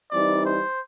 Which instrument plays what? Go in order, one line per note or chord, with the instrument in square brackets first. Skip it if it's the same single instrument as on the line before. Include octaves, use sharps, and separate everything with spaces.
[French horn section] E3 G3 C4 D#4 [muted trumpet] D5
[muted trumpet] C5